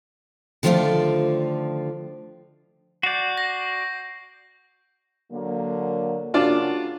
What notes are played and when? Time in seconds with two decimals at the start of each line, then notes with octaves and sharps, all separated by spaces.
0.63 D3 D#3 F3 A3 F4 D5
3.03 F#4 D5 G6 C7
3.37 A#6
5.32 D3 F#3 A#3
6.34 C#3 A#3 D4 F4 F#4 D5